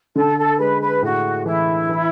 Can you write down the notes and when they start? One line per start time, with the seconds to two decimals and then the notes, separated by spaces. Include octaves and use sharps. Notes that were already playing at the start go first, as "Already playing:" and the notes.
0.16 D3 A4
0.38 A4
0.59 G#3 B4
0.81 B4
1.02 A2 F#4
1.46 E3 E4
1.89 E3